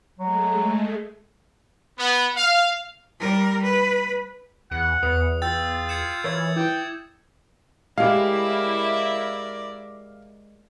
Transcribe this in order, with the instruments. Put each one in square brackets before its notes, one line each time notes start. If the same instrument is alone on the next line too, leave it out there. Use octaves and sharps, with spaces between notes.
[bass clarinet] F#3 [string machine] G#3 A3
[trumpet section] B3
F5
[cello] G3 A#4
B4
[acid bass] E2 [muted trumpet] F#5
[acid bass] E2 [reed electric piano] B4 [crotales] D#6
[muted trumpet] F4 [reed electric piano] G5 [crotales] E6 G6 A6
[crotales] G#6 C#7 E7
[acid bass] E3 [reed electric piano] A#4 C#5 [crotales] E6 G#6
[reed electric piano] E4 [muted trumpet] G5 [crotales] D6
[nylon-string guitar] G#3 G4 [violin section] E4 E5 [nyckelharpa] A#4 D5 [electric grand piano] F5